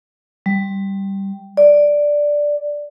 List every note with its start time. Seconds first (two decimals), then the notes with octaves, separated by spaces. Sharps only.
0.46 G3
1.57 D5